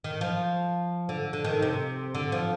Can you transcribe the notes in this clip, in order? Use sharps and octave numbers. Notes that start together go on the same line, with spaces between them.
D#3
F3
D3
D3
D#3
C3
D3
F3